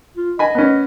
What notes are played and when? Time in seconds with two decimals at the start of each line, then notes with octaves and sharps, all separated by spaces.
0.17 F4
0.39 D#5 G#5 B5
0.55 B3 C#4